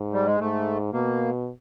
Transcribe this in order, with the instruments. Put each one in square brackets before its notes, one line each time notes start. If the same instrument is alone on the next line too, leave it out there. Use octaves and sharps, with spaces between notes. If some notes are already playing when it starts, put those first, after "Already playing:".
Already playing: [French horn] G#2
[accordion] G3
G#3
[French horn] G#2 [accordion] A3
[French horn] B2 [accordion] A#3